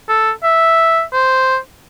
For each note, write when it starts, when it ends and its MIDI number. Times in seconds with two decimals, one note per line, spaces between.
0.09 0.31 69
0.44 1.02 76
1.13 1.58 72